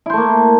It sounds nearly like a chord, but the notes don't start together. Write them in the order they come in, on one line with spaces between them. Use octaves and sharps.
E4 C5 A3 A#3